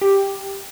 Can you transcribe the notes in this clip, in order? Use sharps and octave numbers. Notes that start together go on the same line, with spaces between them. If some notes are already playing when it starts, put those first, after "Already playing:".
G4